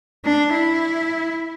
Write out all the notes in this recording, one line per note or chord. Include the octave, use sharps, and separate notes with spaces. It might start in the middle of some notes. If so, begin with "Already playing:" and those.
D4
E4